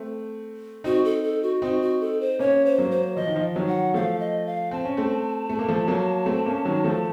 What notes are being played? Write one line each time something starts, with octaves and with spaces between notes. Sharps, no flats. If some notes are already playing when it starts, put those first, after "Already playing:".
Already playing: A3 C4
C4 D#4 F#4
A4
A4
F#4
C4 D#4 F#4
F#4
A4
C5
A#3 C#4 C#5
C5
F#3 A#3
C5
F3 D#5
D#3
F3
D#3 F#3
F#5
F3 A3 F5
D#5
F5
C4 A5
C#4
A3 C4
A3
A#3
F3 A3
F#3 A#3
A3 C4
A#3 C#4
D#3 F#3
F3 A3